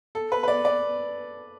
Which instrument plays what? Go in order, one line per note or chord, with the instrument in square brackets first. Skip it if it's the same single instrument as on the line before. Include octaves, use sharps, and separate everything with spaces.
[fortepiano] A4
B4
B4
D5
D5